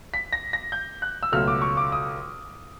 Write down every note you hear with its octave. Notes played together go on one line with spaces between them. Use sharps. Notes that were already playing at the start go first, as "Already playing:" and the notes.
B6
A#6
A#6
G6
F#6
E6
C#2 B2 F#3 A3 F6
D6
C#6
D6
D#6